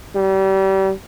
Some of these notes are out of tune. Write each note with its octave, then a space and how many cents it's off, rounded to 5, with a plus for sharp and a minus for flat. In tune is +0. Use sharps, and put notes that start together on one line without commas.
G3 -30